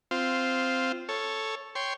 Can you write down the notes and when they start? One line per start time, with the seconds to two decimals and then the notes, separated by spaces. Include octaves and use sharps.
0.11 C4 F4
1.09 A4 C#5
1.75 C#5 G5 C6